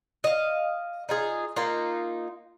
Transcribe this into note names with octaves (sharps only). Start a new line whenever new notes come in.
D#5 F5
D#4 F4 G#4
A#3 D#4 F4